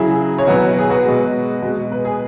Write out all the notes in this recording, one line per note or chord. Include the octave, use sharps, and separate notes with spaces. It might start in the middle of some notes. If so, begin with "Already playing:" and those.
Already playing: C#3 F#3 E4 G#4
C#5
B2 F#3 F#4 B4
G#4
F#4 B4
B2 G#3
B2 G#3
B4
G#4